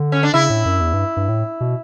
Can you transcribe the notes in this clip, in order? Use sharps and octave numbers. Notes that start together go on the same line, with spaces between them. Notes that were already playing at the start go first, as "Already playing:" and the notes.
Already playing: D3
C#4
D4
C#3 E4
A2
F#2
E2
G2
G2
A2
B2